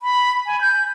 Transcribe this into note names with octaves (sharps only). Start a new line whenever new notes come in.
B5
G#5
G6